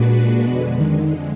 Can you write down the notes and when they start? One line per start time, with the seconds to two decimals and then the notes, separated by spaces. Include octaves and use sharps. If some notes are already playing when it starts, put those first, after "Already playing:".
Already playing: A#2 G#3 D4 F#4 B4
0.47 F2 B2 D3 G#3
0.80 D#3